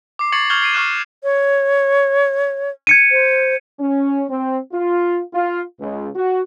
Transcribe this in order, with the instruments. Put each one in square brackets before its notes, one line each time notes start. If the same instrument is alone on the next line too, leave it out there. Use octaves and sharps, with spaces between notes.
[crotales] D6 C7
C#6 G#6 A6 C7 C#7 F#7
C#6 F6 G6 G#6 F7 G7
C7 D7 D#7 G7
C#6 D6 F6 F#6 E7
F6
[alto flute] C#5
[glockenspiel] G#6 C#7 D#7
[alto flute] C5
[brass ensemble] C#4
C4
F4
F4
C#2
F#4